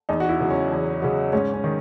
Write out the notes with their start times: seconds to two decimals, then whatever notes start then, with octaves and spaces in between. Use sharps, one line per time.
0.09 E2 D#4
0.20 F#4
0.29 E4
0.40 C#3 F#3
0.50 C#4
0.71 E2
1.02 C#3 F#3
1.33 G#2 C#4
1.54 C#4
1.64 D#3